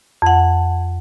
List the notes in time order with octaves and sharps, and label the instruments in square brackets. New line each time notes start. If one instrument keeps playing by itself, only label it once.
[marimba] F2 F#5